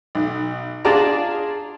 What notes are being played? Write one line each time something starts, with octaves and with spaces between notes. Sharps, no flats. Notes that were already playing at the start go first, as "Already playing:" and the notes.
B1
D4 F4 G#4 D5 A5 A#5